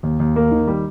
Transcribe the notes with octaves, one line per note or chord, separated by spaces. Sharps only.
D#2
D#2
A#3
D#3
G3